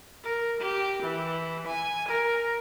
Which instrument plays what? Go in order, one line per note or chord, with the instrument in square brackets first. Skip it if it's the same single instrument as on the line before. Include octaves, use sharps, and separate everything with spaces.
[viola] A#4
G4
E3
G#5
A#4